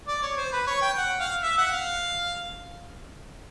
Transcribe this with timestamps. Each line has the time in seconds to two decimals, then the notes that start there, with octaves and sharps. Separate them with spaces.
0.08 D5
0.22 C#5
0.37 C5
0.53 B4
0.67 C#5
0.82 G5
0.98 F#5
1.20 F5
1.43 E5
1.58 F#5
1.72 F5